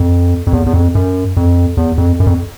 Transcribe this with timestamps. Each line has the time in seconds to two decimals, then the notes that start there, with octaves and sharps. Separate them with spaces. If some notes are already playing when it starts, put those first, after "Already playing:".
Already playing: F2
0.47 F2
0.53 E2
0.66 E2
0.73 F2
0.95 F#2
1.37 F2
1.77 E2
1.98 F2
2.20 F#2
2.27 F2